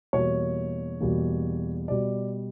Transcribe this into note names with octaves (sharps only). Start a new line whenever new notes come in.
E2 B2 G3 A#3 C#5
E2 B2 G3 A#3
B2 G3 D5